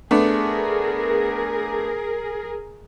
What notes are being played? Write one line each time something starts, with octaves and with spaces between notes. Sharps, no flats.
A3 B3 D4 G#4 A#4